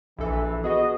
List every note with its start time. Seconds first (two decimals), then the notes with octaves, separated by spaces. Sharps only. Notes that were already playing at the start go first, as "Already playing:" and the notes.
0.19 A#1 E3 A4
0.64 B3 F#4 G#4 D#5